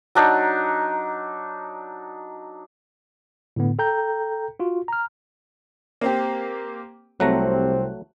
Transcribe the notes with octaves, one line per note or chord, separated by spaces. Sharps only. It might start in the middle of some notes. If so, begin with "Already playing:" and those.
F#3 D4 D#4
A2 D3 B3
A4 G5 A#5 G6
F4 F#4
A#5 F6
A#3 C4 G4
C2 C3 F#3 A3 C4 A#5 F#6